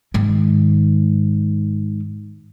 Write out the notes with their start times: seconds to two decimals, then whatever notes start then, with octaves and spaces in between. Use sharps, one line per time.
0.14 G#2 D#3